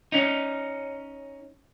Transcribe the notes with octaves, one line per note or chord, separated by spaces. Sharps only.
C#4 D#4